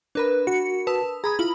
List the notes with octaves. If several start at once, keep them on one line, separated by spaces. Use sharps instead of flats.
D4 A#4 B4 B5
F#4 C#7
B4 A5 D#6 E6
G#4 A#5 B5 D#6 G#6
E4 F4 B5